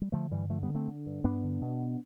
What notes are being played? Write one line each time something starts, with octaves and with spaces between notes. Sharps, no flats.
G3
D3 F3 A3
G2 E3 G3
D3 F3 A3
G3 B3
D3
A3 C4
D3
G2
G2 B3 D4
D3
B2